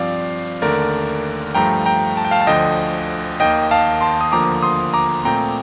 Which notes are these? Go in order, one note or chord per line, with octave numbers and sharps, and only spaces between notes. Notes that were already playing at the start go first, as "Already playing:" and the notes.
Already playing: G2 F3 C4 D5 F5
D#2 D3 A3 A#4 D5
G2 F3 A3 G5 A#5
G5 A#5
A5
G5
F5 A5
A5
D2 D3 F3 D#5 G5
D#2 D#3 A#3 D#5 G5
F5 A5
A5 C6
D#6
D2 D3 F3 A#3 A#5 D6
C6 D#6
A#5 D6
A#2 A3 C4 G5 A#5